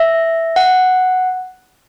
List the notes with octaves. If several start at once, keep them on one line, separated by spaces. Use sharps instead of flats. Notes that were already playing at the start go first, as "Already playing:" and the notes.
Already playing: E5
F#5